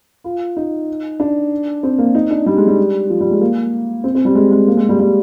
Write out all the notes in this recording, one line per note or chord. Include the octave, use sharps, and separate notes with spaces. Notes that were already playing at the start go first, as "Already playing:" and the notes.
F4
D#4
D4
C4
A#3
D#4
D4
G3
G#3
G3
F3
G3
G#3
A#3
C4
C4
G3
G#3
G#3
A#3
G#3
G3
G3